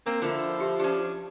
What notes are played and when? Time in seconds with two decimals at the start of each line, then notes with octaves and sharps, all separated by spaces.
0.06 A#3 C4
0.22 D3 F3 E4
0.58 F4 G4 E5
0.80 C#4 D4 G4 D5